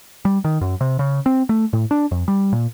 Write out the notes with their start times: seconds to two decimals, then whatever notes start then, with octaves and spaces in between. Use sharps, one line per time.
0.25 G3
0.45 D#3
0.61 F#2
0.81 C3
0.99 C#3
1.26 C4
1.49 A3
1.73 A2
1.91 D4
2.11 F2
2.28 G3
2.53 A#2